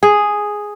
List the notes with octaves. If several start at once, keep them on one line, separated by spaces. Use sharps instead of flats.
G#4